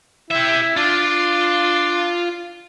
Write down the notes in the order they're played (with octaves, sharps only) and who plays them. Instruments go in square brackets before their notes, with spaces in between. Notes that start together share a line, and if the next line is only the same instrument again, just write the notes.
[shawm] E4 [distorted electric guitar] G4 E5
[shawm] D4 [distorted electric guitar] F4